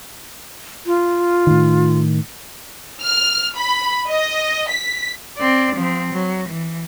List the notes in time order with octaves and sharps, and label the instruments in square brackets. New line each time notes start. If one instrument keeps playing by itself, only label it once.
[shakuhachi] F4
[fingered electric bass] A2 D#3
[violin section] F6
B5
D#5
B6
[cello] C4 D5
F3 C4
F#3
E3